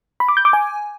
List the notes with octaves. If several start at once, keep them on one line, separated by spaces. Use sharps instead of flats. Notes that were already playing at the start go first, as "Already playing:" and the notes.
B5
D6
G6
D6
G#5